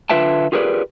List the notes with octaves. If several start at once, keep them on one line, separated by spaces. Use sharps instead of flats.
D3 F4 B4 E5 G5 A5
F4 G4 G#4 A#4 B4 D5